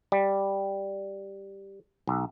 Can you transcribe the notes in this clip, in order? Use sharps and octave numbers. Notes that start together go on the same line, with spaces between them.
G3
B1